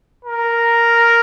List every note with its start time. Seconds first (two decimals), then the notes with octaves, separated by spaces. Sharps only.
0.25 A#4